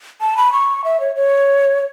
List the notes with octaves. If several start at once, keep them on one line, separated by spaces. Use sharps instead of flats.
A5
B5
C#6
E5
C#5
C#5